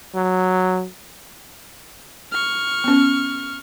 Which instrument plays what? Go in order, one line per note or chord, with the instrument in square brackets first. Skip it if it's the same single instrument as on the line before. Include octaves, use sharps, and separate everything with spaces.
[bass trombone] F#3
[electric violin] C#6 F6
[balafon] B3 C#4